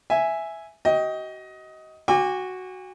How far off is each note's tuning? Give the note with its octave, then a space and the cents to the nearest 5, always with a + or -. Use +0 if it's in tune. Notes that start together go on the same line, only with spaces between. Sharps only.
E5 +0 G#5 +0
F#4 +35 D#5 +20 G5 +0
F#4 +0 G#5 -45 D6 +0